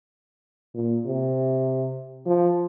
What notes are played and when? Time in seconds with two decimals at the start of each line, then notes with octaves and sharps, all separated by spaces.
0.74 A#2
1.06 C3
2.26 F3